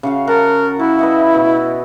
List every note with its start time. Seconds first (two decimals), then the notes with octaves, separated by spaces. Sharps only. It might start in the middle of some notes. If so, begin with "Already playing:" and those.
0.03 C#3 F#4 F5
0.27 A#4 F#5 A5
0.79 E4 F#4
0.99 B4 D#5 E5
1.34 B2